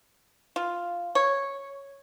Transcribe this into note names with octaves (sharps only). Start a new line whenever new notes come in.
F4
C#5